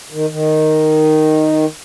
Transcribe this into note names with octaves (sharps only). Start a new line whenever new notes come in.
D#3
D#3